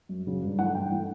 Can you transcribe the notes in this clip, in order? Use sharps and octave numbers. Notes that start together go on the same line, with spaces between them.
F#2
C#3 F#3
G2
E3 A3 F#5
G2 G5
E3 A3